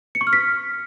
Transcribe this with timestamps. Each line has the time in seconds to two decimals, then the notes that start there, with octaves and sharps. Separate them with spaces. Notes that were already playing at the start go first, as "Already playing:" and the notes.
0.15 C#7
0.21 C#6
0.27 F6
0.33 B6